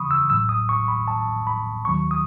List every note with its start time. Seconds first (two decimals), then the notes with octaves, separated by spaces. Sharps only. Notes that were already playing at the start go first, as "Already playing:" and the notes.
Already playing: D#2 C#3 E3 B5 C#6 D#6
0.11 E6
0.30 A1 A2 F#3 E6
0.49 D#6
0.69 C#6
0.88 B5
1.08 A5
1.47 B5
1.85 D#2 D#3 F#3 C#6
2.11 D#6